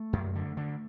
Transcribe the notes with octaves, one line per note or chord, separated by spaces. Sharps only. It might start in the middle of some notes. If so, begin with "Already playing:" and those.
Already playing: A3
F#2
D3
D3